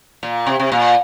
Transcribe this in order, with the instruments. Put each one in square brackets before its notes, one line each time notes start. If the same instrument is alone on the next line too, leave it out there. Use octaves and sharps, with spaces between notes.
[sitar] A#2
C3
C3
A#2